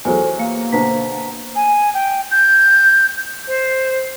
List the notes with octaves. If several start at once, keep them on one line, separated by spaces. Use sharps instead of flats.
E2 F#3 A4 C5 G#5
A#3 F5 C#7
B2 D3 C5 A#5 B6
G#5
G5
G6
C5